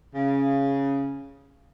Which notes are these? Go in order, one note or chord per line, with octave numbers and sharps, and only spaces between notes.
C#3